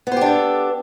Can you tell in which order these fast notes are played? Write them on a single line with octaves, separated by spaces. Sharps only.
B3 C5 G4 D4 A4